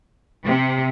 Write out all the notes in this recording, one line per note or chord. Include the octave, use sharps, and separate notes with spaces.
C3